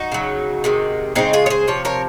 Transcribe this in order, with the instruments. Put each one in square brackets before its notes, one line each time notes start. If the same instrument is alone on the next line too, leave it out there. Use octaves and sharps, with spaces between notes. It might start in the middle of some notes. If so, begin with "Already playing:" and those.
Already playing: [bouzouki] D#4 F#4
C#3 F#3
C3 D#3 G#3
C#3 G#3 C4 D#4
F4 G#4
C#5
G#4 C5
C3 F3 C#5
A#4 C#5